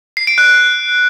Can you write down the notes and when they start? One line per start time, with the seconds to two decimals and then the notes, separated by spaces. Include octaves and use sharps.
0.17 C7
0.27 D7
0.38 F#6